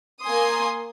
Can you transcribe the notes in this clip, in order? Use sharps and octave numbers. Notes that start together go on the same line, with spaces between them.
A#3 G#5 C6 D#6